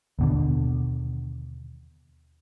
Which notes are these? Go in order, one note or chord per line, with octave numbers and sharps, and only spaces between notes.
D#2 B2 D3